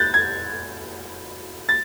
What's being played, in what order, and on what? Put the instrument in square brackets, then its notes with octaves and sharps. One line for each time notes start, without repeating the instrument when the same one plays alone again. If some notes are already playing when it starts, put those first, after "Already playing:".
Already playing: [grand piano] F#6 G6 A6
G#6
A6